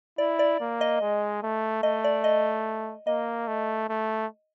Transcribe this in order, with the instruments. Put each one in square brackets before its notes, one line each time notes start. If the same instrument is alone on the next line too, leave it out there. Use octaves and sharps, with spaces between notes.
[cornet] E4 [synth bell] D5
[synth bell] D5
[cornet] A#3
[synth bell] D#5
[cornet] G#3
A3
[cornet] A3 [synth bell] D#5
[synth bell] D5
D#5
[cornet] A#3 [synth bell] D#5
[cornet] A3
A3